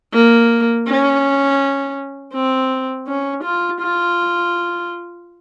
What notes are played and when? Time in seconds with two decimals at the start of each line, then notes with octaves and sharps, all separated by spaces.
0.14 A#3
0.88 C#4
2.34 C4
3.08 C#4
3.44 F4
3.81 F4